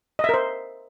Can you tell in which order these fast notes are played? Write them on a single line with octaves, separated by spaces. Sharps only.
D#5 E5 A#4 C5